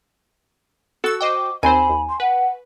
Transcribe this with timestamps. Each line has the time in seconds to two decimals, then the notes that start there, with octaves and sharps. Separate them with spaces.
1.04 F#4 A4 E6
1.21 C5 D#5 G5 D6
1.63 D#2 C4 C5 G#5 B5
1.90 D#2
2.09 C6
2.20 B4 F#5